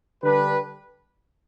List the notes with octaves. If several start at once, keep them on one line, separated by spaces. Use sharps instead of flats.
D3 G3 D4 G4 B4